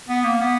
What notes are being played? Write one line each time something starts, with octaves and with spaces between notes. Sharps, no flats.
B3
A#3
B3